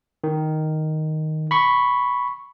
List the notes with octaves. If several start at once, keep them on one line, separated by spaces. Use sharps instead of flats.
D#3
B5 C#6